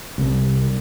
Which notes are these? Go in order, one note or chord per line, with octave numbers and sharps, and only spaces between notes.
C2